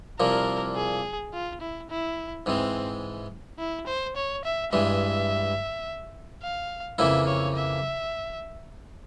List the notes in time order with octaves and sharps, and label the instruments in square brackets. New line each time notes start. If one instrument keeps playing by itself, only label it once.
[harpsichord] C2 A#2 F3 A#3 [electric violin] A#4
[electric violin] G#4
F4
E4
E4
[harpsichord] G#2 E3 G#3 [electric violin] C4
[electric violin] E4
C5
C#5
E5
[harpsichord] G2 E3 G#3 [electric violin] E5
[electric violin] F5
[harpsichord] F2 C#3 E3 A#3 E4 [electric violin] E5
[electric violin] C#5
E5